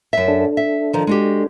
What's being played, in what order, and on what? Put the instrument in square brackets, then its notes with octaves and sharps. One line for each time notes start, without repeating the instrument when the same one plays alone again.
[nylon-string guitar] F#2 E5
[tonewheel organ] D4 A4
[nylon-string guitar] E5
D#3 F3
G#3 F#4 G4